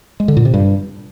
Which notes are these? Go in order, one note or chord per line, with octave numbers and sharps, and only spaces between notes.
G#3
D3
A#2
C3
G2